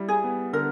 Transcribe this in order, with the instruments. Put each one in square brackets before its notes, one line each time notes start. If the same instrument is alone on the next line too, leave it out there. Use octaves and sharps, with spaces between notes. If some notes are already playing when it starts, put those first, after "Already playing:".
Already playing: [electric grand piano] G3 E4
[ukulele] G#4
[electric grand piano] B3
[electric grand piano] D3 [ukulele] A#4